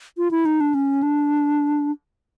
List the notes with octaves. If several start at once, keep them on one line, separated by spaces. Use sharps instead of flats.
F4
E4
D#4
D4
C#4
D4